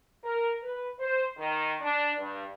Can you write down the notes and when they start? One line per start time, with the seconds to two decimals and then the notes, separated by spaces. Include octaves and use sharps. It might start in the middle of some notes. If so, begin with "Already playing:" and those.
0.23 A#4
0.62 B4
0.99 C5
1.37 D#3
1.81 D4
2.18 G2